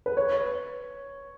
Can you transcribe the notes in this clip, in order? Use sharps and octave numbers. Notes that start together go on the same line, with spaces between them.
B4
C#5